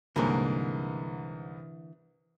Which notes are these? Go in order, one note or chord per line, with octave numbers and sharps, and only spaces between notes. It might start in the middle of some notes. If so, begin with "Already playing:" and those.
C2 G#2 D3 E3 A#3